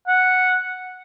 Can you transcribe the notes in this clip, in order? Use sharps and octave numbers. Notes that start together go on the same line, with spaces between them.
F#5